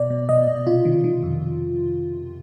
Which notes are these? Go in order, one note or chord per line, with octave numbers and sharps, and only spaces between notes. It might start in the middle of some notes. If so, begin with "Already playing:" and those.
Already playing: B2 D5
B2
B2 D#5
B2
C3 F4
D#3
D#3
F2